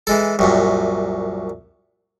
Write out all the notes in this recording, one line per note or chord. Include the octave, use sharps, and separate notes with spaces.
E3 G#3 A4
C2 F#2 A#2